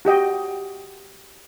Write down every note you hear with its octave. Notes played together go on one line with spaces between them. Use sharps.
F#4 G4 D#5 G5